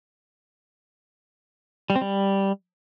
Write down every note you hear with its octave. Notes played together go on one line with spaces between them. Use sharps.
G3
C4
G3